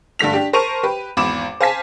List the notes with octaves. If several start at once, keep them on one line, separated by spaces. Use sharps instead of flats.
G2 D3 A3 B6 F7
D4 G4
A#4 C5 A5 C#6 D#7 F7
G4 B4
G#1 E2 B5 D6 E7
C5 F5 G#5 A5 B6